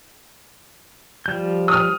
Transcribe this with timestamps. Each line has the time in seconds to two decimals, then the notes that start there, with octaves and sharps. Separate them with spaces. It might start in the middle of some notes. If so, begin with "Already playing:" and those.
1.26 F3 G3 G6
1.68 D#6 F6